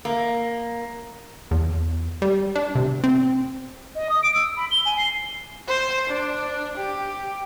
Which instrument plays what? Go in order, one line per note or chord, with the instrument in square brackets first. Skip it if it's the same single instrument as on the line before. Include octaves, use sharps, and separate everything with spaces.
[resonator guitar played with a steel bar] A#3
[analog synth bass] E2
G3
D4
C3
C4
[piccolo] D#5
D#6
D7
E6
B5
G7
G#5
C7
[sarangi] C5
D4
G4